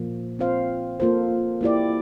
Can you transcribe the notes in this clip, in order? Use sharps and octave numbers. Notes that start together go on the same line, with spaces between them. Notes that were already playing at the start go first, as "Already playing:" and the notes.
Already playing: A#2 F3 A#3
C4 F4 C5 F5
A#3 F4 A4 C5
A#3 E4 G4 D5